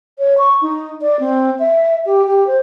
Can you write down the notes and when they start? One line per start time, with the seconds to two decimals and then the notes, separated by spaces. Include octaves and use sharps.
0.18 C#5
0.38 C#6
0.62 D#4
1.02 D5
1.20 C4
1.59 E5
2.06 G4
2.27 G4
2.47 C5